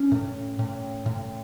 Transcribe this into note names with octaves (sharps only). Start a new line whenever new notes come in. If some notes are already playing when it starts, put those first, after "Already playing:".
Already playing: C#4
A2
A2
A2